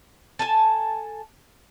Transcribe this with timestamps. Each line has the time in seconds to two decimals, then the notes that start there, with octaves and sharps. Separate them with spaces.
0.39 A4 G#5 A5